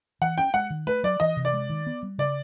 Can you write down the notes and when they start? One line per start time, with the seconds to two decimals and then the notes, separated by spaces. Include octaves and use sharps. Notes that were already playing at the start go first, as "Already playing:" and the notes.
0.21 E3 F#5
0.38 C#4 G5
0.54 G#3 F#5
0.70 D#3
0.87 A3 B4
1.03 F#3 D5
1.20 E3 D#5
1.37 C3
1.45 D5
1.53 G#3
1.70 D#3
1.86 B3
2.03 G3
2.18 C#3 D5